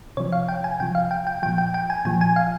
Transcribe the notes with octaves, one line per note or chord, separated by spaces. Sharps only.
C3 F3 C#5
F5
G5
G#5
C3 F3 G5
F5
G5
G5
A#2 F3 G5
G5
G5
G#5
A#2 F3 G#5
G#5
F5